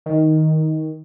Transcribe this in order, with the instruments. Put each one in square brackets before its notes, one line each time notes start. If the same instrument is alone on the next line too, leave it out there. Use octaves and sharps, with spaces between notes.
[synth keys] D#3